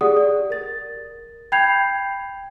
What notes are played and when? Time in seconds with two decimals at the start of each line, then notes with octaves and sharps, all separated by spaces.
0.01 G4 G#4 D5 F#5 D#6
0.17 D5
0.50 A#4 A6
1.52 G5 B5 G6 G#6 C7 F7